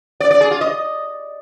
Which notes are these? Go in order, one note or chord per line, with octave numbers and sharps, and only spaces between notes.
D5
D5
G#4
F4
D#5